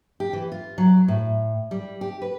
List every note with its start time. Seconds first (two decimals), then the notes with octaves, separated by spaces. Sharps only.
0.20 G4
0.33 E3
0.52 F4
0.78 F#3
1.08 A2
1.71 G3
2.01 G4
2.22 B4